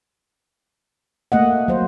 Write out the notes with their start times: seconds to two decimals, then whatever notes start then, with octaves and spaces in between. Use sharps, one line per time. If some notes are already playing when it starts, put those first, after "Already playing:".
1.32 A3 A#3 D#5 F#5
1.68 F#3 C5